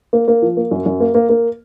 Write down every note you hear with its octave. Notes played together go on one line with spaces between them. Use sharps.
A#3
A#3
F3
A#3
F#2
F#2
A#3
A#3
A#3